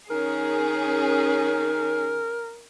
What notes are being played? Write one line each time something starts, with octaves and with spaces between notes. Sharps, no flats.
D#3 C#4 G#4 A#4